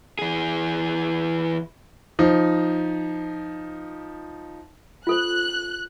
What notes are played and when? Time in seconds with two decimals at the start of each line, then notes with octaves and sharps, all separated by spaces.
0.19 E3 G#4
2.19 F3 D#4
5.07 F4 A4 C5 F#6